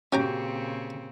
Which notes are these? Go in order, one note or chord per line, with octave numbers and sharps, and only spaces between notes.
A#2 C#3 C4 C#4 F#4 G4 G#5 A#5